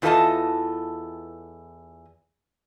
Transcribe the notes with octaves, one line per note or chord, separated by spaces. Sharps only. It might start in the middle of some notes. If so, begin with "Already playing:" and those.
E2 E3 F4 A4 D#5 A5